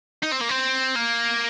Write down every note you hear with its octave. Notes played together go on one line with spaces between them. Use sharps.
D#4
C4
A#3
C4
A#3